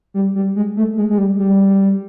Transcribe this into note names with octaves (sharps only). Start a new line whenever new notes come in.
G3
G3
G#3
A3
G#3
G#3
G3
G3